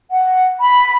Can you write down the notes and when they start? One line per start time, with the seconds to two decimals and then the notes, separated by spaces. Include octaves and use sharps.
0.11 F#5
0.60 B5